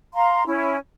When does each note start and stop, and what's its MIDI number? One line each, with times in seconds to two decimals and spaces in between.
0.14 0.43 77
0.14 0.43 82
0.14 0.43 84
0.46 0.76 61
0.46 0.76 64